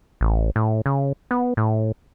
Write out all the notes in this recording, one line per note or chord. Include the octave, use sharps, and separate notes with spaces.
A1
A2
C#3
B3
A2